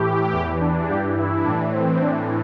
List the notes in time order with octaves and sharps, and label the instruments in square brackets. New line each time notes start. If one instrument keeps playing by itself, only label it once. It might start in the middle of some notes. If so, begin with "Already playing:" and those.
Already playing: [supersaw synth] A2 E3 G4
E2 E3 G4
D4
G2 E3 G4
E4
A2 E3 D4
C4
A2 E3 D4